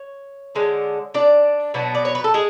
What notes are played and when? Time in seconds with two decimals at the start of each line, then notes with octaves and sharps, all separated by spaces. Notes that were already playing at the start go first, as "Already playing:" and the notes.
Already playing: C#5
0.55 D3 G#3 D4
1.14 D4 D5
1.74 B2 F#3 B3 D4
1.95 D5
2.05 C#5
2.15 B4
2.24 A4
2.34 G#3 G#4